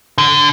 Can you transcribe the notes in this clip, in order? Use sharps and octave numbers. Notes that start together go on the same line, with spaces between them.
D3